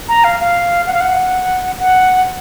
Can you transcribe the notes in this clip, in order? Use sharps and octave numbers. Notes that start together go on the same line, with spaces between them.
A#5
F5
F5
F#5
F5
F#5
F#5